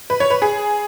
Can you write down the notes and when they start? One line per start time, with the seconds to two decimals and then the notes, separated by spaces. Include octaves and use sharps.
0.10 B4
0.20 C#5
0.30 B4
0.42 G#4